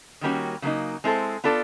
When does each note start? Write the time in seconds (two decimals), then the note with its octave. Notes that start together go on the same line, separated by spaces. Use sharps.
0.21 D#3 G3 A#3 C#4 F#4
0.62 C#3 F#3 A#3 D#4
1.04 G#3 C4 E4 A4 C5
1.44 B3 D4 F4 A4 D5